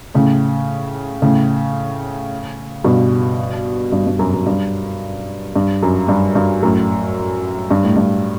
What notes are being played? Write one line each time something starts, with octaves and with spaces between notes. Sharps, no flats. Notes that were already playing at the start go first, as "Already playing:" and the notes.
A2 C#3
A2 C#3
G2 B2
G2
G2
F#2
F#2
G2
G2
F#2
G2
G2
F#2 A2
G2
A2
G2